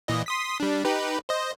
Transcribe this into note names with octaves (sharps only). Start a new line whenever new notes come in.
A#2 E3 D#5
C6 D#6 B6
G3 D4
D#4 G4 B4
C5 D#5